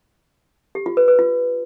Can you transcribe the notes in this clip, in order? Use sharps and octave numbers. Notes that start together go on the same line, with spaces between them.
G4
F4
B4
B4
F4